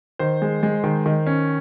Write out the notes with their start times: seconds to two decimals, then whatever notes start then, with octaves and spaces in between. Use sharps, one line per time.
0.19 D#3 C5
0.42 G#3
0.63 G#3
0.84 D#3
1.06 D#3
1.26 C#4